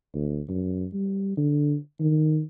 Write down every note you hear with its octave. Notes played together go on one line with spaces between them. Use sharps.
D2
F#2
G3
D3
D#3